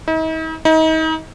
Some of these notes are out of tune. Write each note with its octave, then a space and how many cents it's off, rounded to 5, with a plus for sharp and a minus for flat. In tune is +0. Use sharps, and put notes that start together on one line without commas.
D#4 +45
D#4 +35